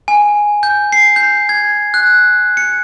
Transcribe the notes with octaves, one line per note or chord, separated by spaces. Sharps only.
G#5
G6
C7
G6
G#6
F#6
C#7